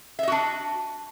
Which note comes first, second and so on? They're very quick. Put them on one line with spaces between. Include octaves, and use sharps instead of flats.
E5 D#5 F#4 D4